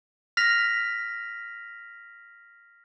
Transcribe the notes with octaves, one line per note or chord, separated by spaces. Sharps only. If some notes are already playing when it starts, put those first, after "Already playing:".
F6 A#6 B6 F7